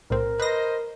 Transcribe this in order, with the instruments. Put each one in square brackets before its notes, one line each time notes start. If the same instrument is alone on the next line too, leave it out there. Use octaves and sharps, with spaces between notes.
[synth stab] B1 A2 C4 [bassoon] A#4
[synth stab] B4 A#6 [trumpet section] C5 D#5